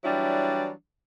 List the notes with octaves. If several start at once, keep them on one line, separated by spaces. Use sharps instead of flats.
E3 F#3 G3 D4 E4